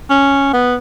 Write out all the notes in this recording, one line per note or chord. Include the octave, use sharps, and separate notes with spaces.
C#4
B3